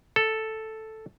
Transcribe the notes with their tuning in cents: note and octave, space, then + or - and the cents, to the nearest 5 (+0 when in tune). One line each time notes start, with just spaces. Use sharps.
A4 +0